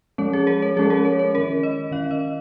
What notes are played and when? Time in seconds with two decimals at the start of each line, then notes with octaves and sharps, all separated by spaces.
0.18 F3 G#3 C#4 C#5
0.33 G#4
0.47 A#4
0.62 C#5
0.76 F3 G#3 C#4 G#4
0.90 A#4
1.05 C#5
1.19 C#5
1.34 D#3 C#4 A#4
1.63 D#5
1.91 D#3 C#4 F5
2.11 D#5